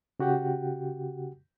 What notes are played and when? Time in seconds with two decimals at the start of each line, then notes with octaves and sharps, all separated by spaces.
0.20 C#3 F#4 G4 F#5 G5